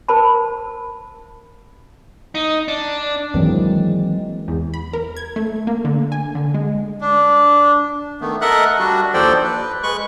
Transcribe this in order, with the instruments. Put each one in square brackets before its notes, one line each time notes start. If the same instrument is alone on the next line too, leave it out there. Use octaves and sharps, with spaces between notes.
[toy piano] A#4 C5 A5 B5
[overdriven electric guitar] D#4
D4
[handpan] D#3 E3 F#3 G#3 A#3 C4
[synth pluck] E2
B5
A#4
G#6
A3
A#3
D3
G#5
D3
G#3
[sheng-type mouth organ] D4
[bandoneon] D#3 A3 B3
A4 A#4 D#5 E5 F#5 F#6
G3 D4 F#4
D#2 F3 A4 C5 D5 G5
B4
G#3 B4 C#6 F#6